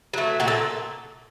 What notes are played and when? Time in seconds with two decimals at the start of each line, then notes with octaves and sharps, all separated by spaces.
0.14 F#3 A3
0.40 A#2 F#4
0.48 A4